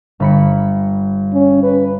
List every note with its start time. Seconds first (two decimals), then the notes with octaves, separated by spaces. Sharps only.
0.20 G1 B5 C#7
1.33 C#4
1.63 B4